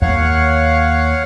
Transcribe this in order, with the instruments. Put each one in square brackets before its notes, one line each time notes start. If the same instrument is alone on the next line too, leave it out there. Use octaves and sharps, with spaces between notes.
[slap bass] D#2 [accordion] C#5 F5 F#5